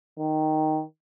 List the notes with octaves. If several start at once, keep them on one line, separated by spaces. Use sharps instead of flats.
D#3